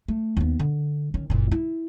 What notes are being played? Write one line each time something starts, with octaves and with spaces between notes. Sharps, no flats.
A3
D#2 B3
D3
D#3 C#4
F#1 A#2
E4